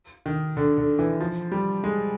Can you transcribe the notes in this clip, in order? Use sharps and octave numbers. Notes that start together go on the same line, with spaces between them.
D#3
D3
D3
E3
F3
G3
G#3